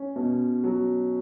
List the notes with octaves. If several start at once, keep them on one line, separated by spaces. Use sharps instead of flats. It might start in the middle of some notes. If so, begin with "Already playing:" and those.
Already playing: C#4
B2
F#3